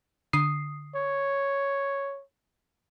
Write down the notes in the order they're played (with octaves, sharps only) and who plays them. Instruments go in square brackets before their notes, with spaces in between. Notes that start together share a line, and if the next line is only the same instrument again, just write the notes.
[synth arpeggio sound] D3 D#6 C7
[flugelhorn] C#5